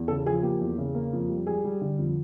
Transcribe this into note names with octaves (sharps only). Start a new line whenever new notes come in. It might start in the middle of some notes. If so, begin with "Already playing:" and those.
Already playing: E2
C#3 A4
F3 G#4
A#3 G4
E2
C#3
A#3
F2
G3
G3 G#4
G3
D3
F2